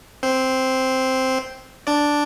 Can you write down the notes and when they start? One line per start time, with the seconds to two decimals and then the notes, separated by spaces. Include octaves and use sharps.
0.23 C4 C5
1.87 D4 D5